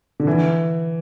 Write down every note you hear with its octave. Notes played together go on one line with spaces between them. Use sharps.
D3
E3